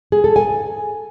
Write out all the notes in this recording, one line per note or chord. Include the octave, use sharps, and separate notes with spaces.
G#4
A4
G#5